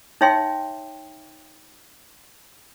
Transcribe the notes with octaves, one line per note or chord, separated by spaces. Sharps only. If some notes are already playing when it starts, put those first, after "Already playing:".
D#4 C#5 E5 G5 C6